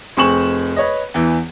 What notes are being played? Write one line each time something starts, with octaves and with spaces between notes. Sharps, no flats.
F1 C4 G#4 C#6 E7 F#7
B4 C#5 D#5
E2 E3